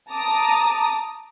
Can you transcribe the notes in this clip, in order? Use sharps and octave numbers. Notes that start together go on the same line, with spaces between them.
A5 A#5 D6 D#6